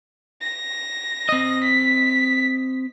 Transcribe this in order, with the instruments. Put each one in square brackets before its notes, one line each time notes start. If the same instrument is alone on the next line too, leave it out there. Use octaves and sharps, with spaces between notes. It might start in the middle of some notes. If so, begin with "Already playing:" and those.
[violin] A#6
[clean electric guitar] C4 D#5
[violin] B6